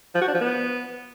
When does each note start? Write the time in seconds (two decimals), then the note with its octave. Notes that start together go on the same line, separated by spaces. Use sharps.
0.15 F3
0.21 F#4
0.28 D4
0.34 F3
0.41 B3